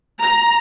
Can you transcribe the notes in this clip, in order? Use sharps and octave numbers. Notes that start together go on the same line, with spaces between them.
A#5